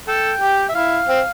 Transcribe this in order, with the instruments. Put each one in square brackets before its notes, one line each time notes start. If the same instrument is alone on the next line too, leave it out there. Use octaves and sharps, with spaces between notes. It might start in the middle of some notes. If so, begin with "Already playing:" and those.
[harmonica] A4 [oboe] G5
[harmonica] G4
[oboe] E5
[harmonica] E4 [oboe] F5
[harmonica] C4